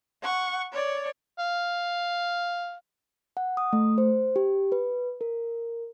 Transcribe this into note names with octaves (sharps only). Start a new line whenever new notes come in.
F#5 C#6
C#5 D5
F5
F#5
D#6
A3
C5
G4
B4
A#4